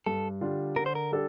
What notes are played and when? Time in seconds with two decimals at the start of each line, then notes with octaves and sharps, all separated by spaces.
0.06 G2 A4
0.41 D3 G3 D4 F4
0.76 D3 A#4
0.86 C5
0.95 A#4
1.11 G3 D4 A4